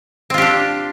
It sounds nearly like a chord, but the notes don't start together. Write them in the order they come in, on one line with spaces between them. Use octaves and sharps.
C4 F4 G4 D4